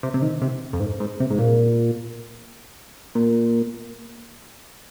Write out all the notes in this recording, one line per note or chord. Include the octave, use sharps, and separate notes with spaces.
C3
C3
D#3
C3
F2
G#2
G#2
C3
G#2
A#2
A#2